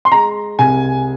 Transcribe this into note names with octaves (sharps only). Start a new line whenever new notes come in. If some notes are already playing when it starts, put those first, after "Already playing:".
C6
G#3 A#5
C2 G#5